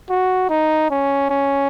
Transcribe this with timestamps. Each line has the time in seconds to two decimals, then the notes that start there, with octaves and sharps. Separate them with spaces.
0.09 F#4
0.49 D#4
0.90 C#4
1.30 C#4